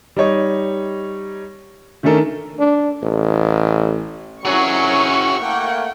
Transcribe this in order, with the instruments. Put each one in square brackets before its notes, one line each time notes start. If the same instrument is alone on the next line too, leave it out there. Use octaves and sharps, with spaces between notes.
[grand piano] G3 D#4 C#5 D#5
D#3 A3 C#4 D4 A4 A#4
[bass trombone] D4
A1
[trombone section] C2 D#3 F#3 [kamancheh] C#4 E4 [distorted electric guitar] F#4 G#4 [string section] C#6
[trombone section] A3 A#3 [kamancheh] F#5 G5